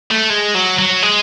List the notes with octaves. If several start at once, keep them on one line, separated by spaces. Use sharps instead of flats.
A3
G#3
F#3
F#3
G#3